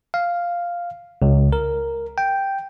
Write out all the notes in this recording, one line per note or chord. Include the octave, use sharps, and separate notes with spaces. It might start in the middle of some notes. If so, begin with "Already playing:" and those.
F5
C#2
A#4
G5